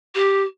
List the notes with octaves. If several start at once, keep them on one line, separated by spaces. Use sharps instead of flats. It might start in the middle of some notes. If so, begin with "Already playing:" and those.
G4